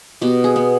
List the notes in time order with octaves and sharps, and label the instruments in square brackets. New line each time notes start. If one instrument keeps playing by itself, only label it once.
[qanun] B2 G4
G#4
B3